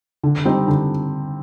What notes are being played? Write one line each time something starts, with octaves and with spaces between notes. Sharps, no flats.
D3
G3 C4 D#4
D3